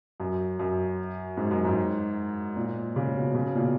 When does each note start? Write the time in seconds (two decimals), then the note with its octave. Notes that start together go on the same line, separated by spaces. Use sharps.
0.20 F#2
0.59 F#2
1.37 G#2
1.51 F#2
1.65 G#2
2.56 A#2
2.96 C#3
3.15 B2
3.35 C#3
3.45 B2
3.55 A#2